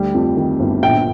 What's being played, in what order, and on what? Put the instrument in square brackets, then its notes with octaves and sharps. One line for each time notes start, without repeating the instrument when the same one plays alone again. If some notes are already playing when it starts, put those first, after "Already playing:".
Already playing: [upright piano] D2 G3
F2
D#3
G1
A#1 G5